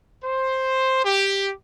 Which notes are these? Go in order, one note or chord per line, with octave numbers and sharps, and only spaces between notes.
C5
G4